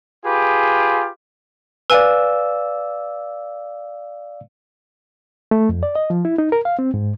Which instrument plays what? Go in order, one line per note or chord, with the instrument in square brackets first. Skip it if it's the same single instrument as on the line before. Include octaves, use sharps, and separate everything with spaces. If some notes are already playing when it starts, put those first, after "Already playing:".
[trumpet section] F4 G4 G#4 B4
[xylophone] B4 G#5 [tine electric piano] D5 F5 E6
[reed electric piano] A3
F2
D5
D#5
F3
E4
D#4
A#4
F5
C4
G#2